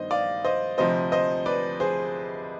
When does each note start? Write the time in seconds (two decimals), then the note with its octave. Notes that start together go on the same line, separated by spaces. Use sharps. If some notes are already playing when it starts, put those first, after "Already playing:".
Already playing: G2 D#3 B3 C5 D#5
0.11 D5 F5
0.45 C5 D#5
0.78 D2 C3 F3 C5 D#5
1.12 C5 D#5
1.46 B4 D5
1.80 G#4 C5